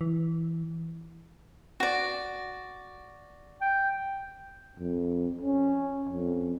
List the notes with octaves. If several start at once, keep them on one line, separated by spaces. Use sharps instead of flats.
E3
F#4 D5
G5
F2
C#4
F2